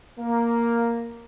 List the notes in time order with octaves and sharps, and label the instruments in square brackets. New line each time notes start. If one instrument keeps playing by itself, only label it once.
[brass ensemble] A#3